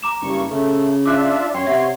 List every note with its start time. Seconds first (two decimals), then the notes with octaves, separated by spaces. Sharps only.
0.03 A#5 D6 E7
0.22 F#1 G2 C#6
0.50 C#3 A3
1.06 D4 F4 E5 D6 F#6
1.54 F#2 C#5 G5 C6
1.67 C3 E5 F#5